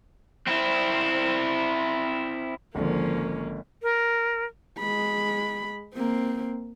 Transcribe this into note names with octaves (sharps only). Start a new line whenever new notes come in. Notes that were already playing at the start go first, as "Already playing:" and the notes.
C4 E4
G#1 D3 F3 A#3 C#4
A#4
G#3 B5
A#3 C4